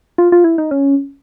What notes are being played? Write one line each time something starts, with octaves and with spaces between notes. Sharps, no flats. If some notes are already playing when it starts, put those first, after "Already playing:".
F4
F4
E4
D#4
C#4